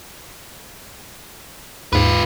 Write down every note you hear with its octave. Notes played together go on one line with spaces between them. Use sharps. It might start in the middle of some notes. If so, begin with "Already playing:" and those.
D#2 G#2 F4 B4